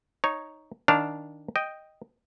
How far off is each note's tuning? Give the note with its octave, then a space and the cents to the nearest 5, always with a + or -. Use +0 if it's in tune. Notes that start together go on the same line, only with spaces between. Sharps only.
D#4 +0 C#5 +0
D#3 +0 D4 -10 F5 -5
D#5 +0 G5 +0